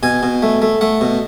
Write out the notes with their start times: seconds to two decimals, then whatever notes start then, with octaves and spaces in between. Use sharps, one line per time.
0.03 B2 G#5
0.23 B2
0.42 A3
0.62 A3
0.81 A3 F#5
1.01 B2